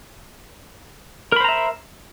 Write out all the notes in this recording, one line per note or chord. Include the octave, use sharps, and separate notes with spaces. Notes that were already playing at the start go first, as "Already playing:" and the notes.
A#4 C5 E5 A#5 B5